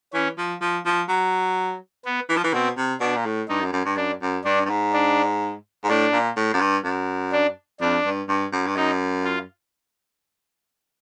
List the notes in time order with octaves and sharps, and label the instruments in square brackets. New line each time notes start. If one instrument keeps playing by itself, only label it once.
[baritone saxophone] E3 [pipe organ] C#4
[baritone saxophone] F3
F3
F3
F#3
[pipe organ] B3
[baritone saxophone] E3
F3
E3
[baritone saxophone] B2 [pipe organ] C4
[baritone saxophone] C3
[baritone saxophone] B2 [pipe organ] D4
[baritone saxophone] A#2
A2
[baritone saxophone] G2 [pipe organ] D#4
[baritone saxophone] F#2
F#2
G2
[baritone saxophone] F#2 [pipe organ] D4
[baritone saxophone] F#2
[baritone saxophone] G2 [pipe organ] D4
[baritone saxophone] G2
G#2
[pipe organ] D4
[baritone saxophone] G#2
[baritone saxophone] A2 [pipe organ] D4
[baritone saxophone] A#2
A2
F#2
G2
F#2
[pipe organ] D4
[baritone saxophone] F2 [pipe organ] D4
[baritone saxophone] G2
G2
F#2
G2
[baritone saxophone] F#2 [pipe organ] D#4
[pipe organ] F4